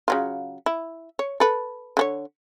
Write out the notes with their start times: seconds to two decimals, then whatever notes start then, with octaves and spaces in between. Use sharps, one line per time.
0.08 C#3 F#3 F4
0.66 E4
1.19 C#5
1.40 A4 B4
1.97 D3 C#4 C#5